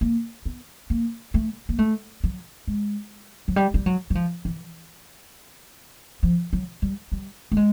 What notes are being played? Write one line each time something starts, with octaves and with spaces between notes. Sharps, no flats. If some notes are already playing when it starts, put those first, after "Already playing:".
A#3
B3
A#3
A3
A#3
A3
F#3
G#3
F#3
G3
G3
F#3
F#3
F3
E3
F3
F#3
G3
G3
A3
G#3